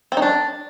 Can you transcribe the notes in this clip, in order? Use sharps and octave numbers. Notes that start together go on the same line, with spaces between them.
C4
D#4
D4